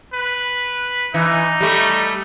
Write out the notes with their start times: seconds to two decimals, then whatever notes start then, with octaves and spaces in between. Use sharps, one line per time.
0.14 B4
1.14 E3 D#4
1.61 G3 A3